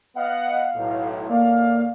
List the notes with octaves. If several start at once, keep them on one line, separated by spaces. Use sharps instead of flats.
B3 D#5 F5 F#5
B1 A2
A2 A#3 D5 F5